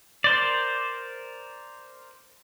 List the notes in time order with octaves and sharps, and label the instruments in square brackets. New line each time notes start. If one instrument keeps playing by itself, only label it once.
[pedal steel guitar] A#4 C5 D5